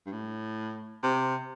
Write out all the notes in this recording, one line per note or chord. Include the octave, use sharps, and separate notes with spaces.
G2
A2
C3